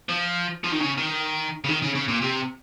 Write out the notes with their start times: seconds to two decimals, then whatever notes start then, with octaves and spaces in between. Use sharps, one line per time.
0.09 F3
0.64 F3
0.72 D#3
0.80 C#3
0.98 D#3
1.64 C#3
1.69 D#3
1.82 C#3
1.95 C#3
2.08 A#2
2.22 C3